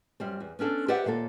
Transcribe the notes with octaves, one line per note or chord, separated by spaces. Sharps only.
F#2 G3 C4
E2
B3 C#4 D4 A4
G4 B4 C5 D5 E5 F#5
D#2 A#2 G#3 A#3 A4